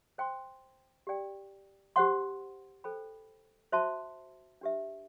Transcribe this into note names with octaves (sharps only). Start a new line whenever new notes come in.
C5 G5 C6
G4 D5 G5
G4 C5 F#5 C6
A4 C5 G5 B5
F#4 C5 E5 A5 C6
D4 G4 B4 E5